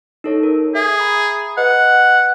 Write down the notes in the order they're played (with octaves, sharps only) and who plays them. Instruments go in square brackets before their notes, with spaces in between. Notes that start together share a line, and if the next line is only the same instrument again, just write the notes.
[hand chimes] D#4 A4 C#5
A#4
[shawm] G#4 [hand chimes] E5
[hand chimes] A#5 B5 D#6
[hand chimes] B4 D#5 [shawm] F#5